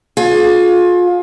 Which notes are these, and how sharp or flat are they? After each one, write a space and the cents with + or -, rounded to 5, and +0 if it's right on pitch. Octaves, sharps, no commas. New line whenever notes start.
F4 +30 G#4 +35